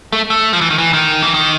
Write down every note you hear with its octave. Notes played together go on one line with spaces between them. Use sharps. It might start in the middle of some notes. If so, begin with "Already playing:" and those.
A3
A3
F3
E3
D#3
E3
D#3
E3
D#3